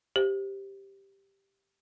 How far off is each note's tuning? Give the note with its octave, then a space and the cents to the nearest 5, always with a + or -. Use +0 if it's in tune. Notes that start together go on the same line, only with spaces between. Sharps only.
G4 +0 C5 +0